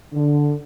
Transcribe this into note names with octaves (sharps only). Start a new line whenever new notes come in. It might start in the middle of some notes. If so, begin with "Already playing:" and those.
D3